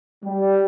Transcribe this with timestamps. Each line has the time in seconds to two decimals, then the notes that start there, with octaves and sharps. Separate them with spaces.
0.24 G3